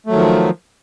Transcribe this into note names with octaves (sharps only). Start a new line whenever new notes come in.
D#3 F3 F#3 A3